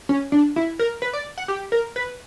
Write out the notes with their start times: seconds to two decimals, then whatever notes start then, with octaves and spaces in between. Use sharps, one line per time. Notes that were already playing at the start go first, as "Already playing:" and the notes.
0.09 C#4
0.32 D4
0.56 E4
0.79 A#4
1.02 B4
1.13 D5
1.38 F#5
1.48 G4
1.72 A#4
1.96 B4